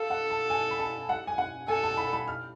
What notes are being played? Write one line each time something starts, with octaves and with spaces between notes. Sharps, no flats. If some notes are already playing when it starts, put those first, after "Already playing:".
Already playing: A4 F5
F#5
A5
G#5
B5
A5
F#5
G#5
F#5
A4 G#5
A5
B5
B5
F6